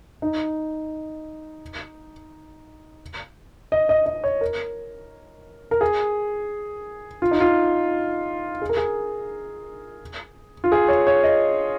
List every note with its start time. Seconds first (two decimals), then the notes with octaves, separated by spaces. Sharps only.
0.22 D#4
3.72 D#5
3.89 D#5
4.06 D#5
4.24 C#5
4.41 A#4
5.71 A#4
5.81 G#4
7.22 F4
7.31 D#4
7.40 F4
8.62 G#4
8.69 A#4
8.77 G#4
10.64 F4
10.72 G#4
10.88 C#5
11.07 C#5
11.23 D#5